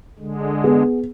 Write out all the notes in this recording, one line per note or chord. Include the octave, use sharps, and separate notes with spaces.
D3 G#3
B3 G#4